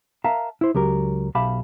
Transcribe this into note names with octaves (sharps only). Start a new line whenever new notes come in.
A#4 E5 F5 A5 A#5
E4 C5
C#2 F#3 G4 A#4
B1 G4 E5 F5 A5 B5